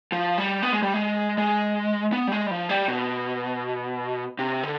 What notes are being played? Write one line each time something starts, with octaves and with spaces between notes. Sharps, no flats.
F3
G3
B3
G#3
G3
G#3
G#3
B3
G3
G#3
G3
F3
G3
B2
C3
D3